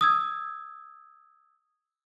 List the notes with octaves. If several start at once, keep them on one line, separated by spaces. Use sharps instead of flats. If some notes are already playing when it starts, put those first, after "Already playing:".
D#6 E6 G#6